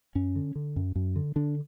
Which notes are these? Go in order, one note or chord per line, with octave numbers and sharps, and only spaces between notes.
F#2 C#4
D3
D3
F#2
F#2
D3
D3 D4